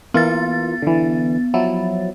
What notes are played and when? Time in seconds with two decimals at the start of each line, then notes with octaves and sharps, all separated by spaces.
0.14 E3 A#3 B3 F4 A6
0.82 D3 E3
1.54 F3 F#3 E4